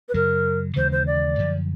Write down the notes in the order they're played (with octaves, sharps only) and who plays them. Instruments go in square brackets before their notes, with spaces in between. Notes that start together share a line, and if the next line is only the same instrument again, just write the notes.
[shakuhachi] B4
[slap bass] F#2 C#3 F#3 [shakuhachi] A#4
[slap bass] D#2 C#3 E3 G#3 [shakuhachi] C5
[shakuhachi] C5
D5
[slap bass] F#2 D3 F3